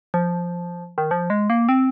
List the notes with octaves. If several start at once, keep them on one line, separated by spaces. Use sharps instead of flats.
F3
D#3
F3
G#3
A#3
C4